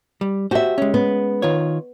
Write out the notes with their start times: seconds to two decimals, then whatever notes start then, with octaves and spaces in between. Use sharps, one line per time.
0.21 G3
0.51 F#4 G4 C5 E5
0.78 G#3 C#4
0.94 B3
1.42 D#3 F4 C#5